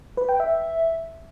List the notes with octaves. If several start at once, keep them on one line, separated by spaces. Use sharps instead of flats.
B4
G5
E5